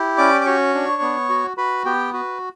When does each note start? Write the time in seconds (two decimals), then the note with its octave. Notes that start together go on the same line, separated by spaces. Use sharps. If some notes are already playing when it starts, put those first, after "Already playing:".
Already playing: E4 G4
0.18 C#4 D5 D6
0.41 D6
0.46 F#4 C#5 C#6
0.75 D4
1.02 B3
1.29 F#4
1.57 F#4 B4 B5
1.85 B3 G4 G5
2.13 F#4 B4